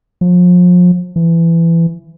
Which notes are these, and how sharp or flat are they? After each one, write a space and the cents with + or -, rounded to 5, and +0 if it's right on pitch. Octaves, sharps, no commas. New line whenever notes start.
F3 +35
E3 +20